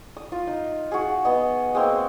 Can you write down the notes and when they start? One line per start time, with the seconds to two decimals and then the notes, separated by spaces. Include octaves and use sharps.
0.17 D#6
0.32 F4
0.47 D#4
0.92 F#4 G#4
1.25 B3 D#5
1.75 G#3 A#3 C4